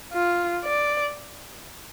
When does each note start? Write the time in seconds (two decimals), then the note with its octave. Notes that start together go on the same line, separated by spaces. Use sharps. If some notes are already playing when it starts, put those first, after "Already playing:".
0.12 F4
0.64 D5